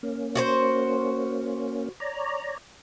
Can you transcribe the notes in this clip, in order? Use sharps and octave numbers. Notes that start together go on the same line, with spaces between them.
A#3 C#4
F#4 G4 C5
C#5 D5 A#5